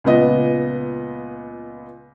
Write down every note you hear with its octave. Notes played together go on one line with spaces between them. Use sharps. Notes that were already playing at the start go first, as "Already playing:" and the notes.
C#2 A#2 B3 D#5